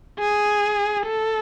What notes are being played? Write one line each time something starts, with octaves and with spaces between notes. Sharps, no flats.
G#4
A4